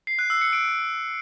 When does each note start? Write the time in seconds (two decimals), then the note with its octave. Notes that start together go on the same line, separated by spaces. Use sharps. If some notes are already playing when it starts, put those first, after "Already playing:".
0.07 C7
0.19 F#6
0.30 E6
0.41 C#7
0.53 D7